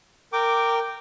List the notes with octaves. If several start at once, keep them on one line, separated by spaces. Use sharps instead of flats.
A#4 G5 D6